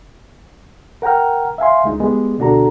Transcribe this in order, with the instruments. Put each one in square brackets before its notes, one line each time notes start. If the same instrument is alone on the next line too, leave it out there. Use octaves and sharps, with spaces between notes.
[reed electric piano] A#4 F#5 G5 A#5 F6
E5 F5 G#5 C6
C#2 G#3 D#4
G3 G#3 B3
D2 B2 D4 F#4 A4 A#5